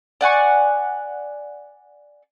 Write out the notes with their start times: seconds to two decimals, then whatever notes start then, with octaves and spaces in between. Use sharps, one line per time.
0.21 D5 F#5 G#5 C#6